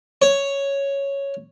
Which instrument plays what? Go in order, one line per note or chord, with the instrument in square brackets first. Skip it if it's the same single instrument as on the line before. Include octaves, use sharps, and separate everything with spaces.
[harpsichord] C#5